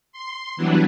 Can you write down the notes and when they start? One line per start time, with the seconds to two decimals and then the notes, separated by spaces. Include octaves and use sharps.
0.12 C6
0.57 E3 F#3 G3 B3 D4 E4